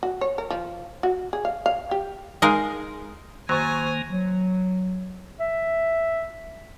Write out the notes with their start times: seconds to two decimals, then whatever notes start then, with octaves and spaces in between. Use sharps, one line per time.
0.03 F#4
0.21 C#5
0.38 A#4
0.50 F3
1.03 F#4
1.33 G#4
1.45 F5
1.66 F5
1.91 G4
2.42 G#3 D#4 G#4 A#4 F5
3.49 D#3 F#3 A#3 C5 G#5 C#6 A6
4.08 F#3
5.40 E5